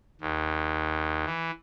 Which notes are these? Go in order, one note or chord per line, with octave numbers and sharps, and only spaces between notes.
D#2
E3